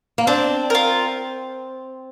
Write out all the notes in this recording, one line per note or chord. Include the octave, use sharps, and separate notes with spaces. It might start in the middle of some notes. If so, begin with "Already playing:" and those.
A#3
C4 D4
F4 A#4